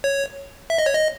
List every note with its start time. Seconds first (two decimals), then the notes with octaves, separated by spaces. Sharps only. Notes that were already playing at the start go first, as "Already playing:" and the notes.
0.04 C#5
0.70 E5
0.78 D#5
0.86 C#5
0.94 D#5